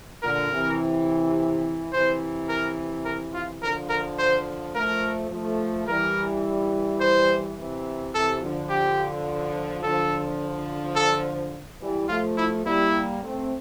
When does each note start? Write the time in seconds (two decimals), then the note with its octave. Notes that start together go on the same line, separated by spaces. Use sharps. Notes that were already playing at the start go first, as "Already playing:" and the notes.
0.22 A#2 D3 A#4
0.51 C3 E3
1.92 C3 E3 C5
2.49 A#4
3.05 A#4
3.34 F4
3.62 D3 F3 A#4
3.89 A#4
4.19 C5
4.75 F3 A3 A#4
5.31 F3 A3
5.88 E3 G3 A#4
7.00 C5
7.57 C3 E3
8.13 C3 E3 A4
8.41 D3 F3
8.70 G4
9.83 D3 F3 A4
10.96 A4
11.80 E3 G3
12.09 F3 A3 F4
12.37 E4
12.65 G3 A#3 E4
13.22 A3 C4